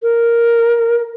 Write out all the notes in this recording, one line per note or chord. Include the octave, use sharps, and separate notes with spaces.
A#4